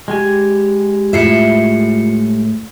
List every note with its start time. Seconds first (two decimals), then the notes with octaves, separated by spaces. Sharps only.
0.08 G#3 G4 G#5
1.13 A2 F4 E5 C7 C#7